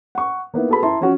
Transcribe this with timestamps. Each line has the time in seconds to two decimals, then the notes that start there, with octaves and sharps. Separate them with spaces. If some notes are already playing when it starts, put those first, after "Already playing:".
0.15 F#5 C#6
0.54 A#3 B3 D#4 E4
0.69 F#4 G#4 A4 B4 B5
0.83 E4 A5 A#5 C6
1.00 F3 C#4 F#4